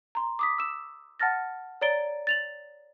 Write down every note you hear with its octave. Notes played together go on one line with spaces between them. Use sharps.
A#5 C6
D6 D#6 B6
E6 E7
F#5 A5 F6 A6 A#6
C#5 D5 A#5 A6 D7 G7
A6 F7 F#7